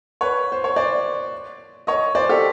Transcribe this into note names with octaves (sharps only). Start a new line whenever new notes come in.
B4 C#5
C5
C#5
C5 D5
C#5 D#5
C5 D5
G4 A4